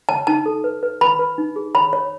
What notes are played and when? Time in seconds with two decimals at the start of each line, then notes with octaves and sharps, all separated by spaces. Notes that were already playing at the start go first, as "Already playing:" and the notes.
0.09 C#5 A5
0.27 D#4 A5
0.46 A4
0.64 B4
0.83 B4
1.01 B4 B5
1.19 B4
1.38 D#4
1.56 G#4
1.75 C#5 B5
1.93 C#5